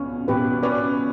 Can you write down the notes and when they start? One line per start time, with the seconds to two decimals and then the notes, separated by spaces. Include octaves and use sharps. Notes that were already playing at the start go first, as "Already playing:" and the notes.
Already playing: C#2 B2 C#4
0.28 B2 G4 B4
0.63 C#4 B4 D5